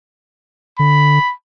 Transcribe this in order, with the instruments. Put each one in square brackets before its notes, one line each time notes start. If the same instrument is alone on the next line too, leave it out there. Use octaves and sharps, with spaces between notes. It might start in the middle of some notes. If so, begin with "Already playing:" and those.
[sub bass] D3 [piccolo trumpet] B5